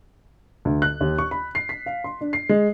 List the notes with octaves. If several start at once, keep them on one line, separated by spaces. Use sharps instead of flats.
D2
F#6
D#2
C#6
B5
C7
B6
F5
C6
D4
C7
G#3